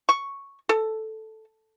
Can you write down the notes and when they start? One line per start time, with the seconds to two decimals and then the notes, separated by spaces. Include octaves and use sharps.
0.09 C#6
0.69 A4